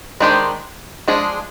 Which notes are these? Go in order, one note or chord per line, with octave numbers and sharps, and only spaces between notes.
D#3 G#3 D4 G4 C5
F3 G#3 D4 G#4